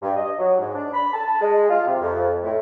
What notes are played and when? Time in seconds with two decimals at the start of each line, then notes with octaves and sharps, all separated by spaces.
0.02 G2
0.16 D#5
0.38 F#3
0.59 G#2
0.75 D4
0.94 B5
1.13 A5
1.41 G#3
1.69 F4
1.87 C3
2.01 F2
2.43 A2